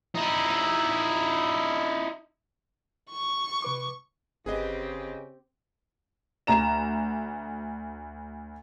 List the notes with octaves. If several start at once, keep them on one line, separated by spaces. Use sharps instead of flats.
D#4 E4
C#6
C3 B4 D6
G1 C#3 C4 G4 G#4 B4 D#5
D2 A#5 E7